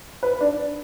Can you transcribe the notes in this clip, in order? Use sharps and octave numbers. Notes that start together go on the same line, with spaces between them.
B4
D4